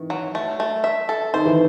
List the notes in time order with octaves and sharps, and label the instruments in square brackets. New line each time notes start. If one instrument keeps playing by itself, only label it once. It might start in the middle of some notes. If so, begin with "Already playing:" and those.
Already playing: [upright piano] D#3 E3
[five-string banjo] F#3
A3
A3
E5
A4
[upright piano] D#3 [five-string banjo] C5
[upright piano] E3